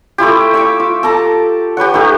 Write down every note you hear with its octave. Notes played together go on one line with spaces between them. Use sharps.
A3 E4 F4 G4
E5 C#6 D6
F4
A4 A5 A#5 D6
G4 B4 C#5 F#5
A3 D#4 G4